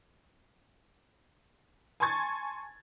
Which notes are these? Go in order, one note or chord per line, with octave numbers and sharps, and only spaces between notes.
G#5 A5 C6 C#6 G#6 A6